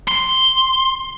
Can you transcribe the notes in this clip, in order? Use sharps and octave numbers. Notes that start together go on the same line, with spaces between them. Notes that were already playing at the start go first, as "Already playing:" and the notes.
C6